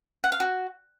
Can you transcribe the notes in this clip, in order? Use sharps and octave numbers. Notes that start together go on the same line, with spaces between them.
F#5
F5
F#4